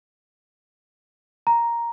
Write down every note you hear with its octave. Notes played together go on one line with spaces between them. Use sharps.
A#5